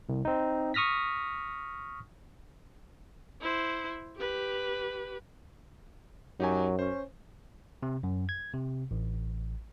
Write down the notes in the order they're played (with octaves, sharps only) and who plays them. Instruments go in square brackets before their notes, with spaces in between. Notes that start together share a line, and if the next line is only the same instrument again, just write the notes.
[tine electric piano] C2
C4 D#4
C#6 D#6 F6 A#6 B6
[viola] E4 C5
G4 B4
[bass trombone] F#2 [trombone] F#3 [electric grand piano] D#4 G4 G#5
[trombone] C#4 [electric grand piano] C5
[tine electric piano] C3
F#2
G#6
C3
A1